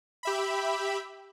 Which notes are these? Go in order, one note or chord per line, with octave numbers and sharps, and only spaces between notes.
G4 E5 B5